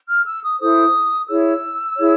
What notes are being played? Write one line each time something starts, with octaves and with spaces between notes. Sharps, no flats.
F6
E6
D#6
E4 A4 C5 D#6
E4 G#4 C#5 E6
E4 G#4 C#5